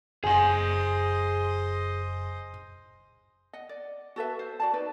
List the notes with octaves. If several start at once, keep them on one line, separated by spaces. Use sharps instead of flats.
F#1 G#4 C5 D#5 F#5 G#5
D#5 F#5
D5
F#4 A4 B4 E5
C5
F#4 D5 A5
D#4 B4 D5